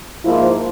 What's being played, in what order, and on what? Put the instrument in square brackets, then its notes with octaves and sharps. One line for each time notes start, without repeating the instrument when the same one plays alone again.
[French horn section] G#2 F3 A#3 E4